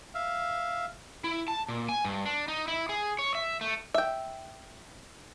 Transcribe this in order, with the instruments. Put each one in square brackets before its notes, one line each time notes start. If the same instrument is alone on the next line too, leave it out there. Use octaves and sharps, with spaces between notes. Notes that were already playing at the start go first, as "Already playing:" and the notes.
[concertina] E5 F5
[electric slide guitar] E4
A5
A#2
G#5
G2
D4
D#4
E4
G#4
C#5
E5
A3
[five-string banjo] E5 G5